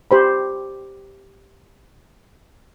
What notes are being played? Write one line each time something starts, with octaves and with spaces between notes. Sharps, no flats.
G4 C5 B5